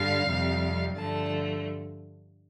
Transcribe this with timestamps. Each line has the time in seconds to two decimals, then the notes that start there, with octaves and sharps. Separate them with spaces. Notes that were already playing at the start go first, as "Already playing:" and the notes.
Already playing: G2 D3 G3 F5
0.27 F2 C3 G3
0.96 G2 D3 F3 A3 A5